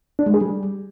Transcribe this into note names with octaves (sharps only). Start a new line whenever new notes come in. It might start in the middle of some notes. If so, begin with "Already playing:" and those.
D4
G#3
G#4
G3